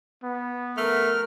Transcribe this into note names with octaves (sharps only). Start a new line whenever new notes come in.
B3
A3 A#4 F6